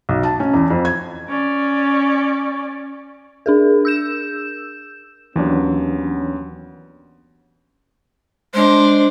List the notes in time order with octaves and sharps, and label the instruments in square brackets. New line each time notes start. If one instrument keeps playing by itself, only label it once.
[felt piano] B1
A5
C#4
E2
F2
G#6
[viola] C#4 D5
[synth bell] D4 G#4 A#4
E6 G6 E7
[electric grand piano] D#2 F#3 [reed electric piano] E3 D4 [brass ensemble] B3 C#4
[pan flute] G#3 [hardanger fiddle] D4 C5